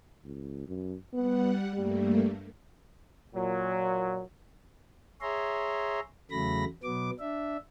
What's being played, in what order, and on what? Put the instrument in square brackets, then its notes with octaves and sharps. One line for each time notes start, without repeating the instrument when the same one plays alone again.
[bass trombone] C#2
F#2
[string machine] G3 F#5 [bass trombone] B3
[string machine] G2 A3 A#3 [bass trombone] G3
[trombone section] A#2 F#3
[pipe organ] G#4 C#5 E5 A#5 C6
E2 C#3 F#3 A3 B5 A#6
B2 F#3 B3 D6
D4 E5